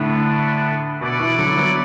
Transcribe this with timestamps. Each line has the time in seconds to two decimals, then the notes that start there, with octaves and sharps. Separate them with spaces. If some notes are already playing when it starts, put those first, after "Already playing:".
Already playing: A2 D3 B3 D4 A4
1.00 B2 E4 B4 D5 F#5
1.19 B2 E3
1.38 D3 F#3
1.57 F#3 B3